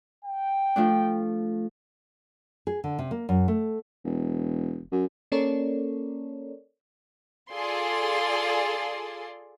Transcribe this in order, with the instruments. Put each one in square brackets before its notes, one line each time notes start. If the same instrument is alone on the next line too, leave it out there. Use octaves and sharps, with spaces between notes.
[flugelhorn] G5
[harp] F3 A3 D4
[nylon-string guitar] G#4
D3
C3
A#3
F#2
A3
[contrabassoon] E1
F#2
[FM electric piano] A#3 C#4 A4 A#4 C#5 D5
[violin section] F4 G#4 A4 D5 C6